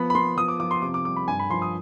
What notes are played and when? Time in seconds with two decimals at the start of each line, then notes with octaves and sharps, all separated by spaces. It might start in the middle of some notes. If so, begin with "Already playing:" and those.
Already playing: F3 B3 B5
0.10 B5
0.15 B3 C6
0.37 F3 D#6
0.48 D6
0.60 F3 D6
0.71 C6
0.82 C3 D6
0.94 D6
1.05 G3 D6
1.16 B5
1.28 G2 G#5
1.39 B5
1.50 F3 C6
1.62 D#6